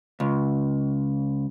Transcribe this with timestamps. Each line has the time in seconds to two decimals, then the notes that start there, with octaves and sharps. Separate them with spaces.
0.20 C#2